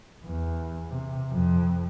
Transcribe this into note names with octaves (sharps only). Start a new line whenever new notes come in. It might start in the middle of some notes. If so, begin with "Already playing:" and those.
E2
C3
F2